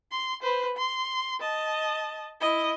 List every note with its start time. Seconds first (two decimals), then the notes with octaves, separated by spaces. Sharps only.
0.11 C6
0.42 B4 C5
0.77 C6
1.40 D#5 A5
2.41 E4 D#5